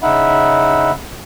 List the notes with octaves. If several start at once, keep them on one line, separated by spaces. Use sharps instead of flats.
C#3 D#4 E5 F#5 B5